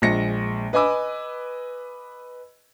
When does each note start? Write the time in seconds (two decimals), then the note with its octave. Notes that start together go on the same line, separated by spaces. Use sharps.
0.02 A#1 G#3 A#6 C#7
0.73 B4 D#5 G#5 B5 D6 E6